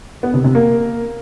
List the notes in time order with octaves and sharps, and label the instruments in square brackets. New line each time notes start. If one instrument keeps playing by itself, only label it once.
[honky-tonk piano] B3
C3
C3
A#3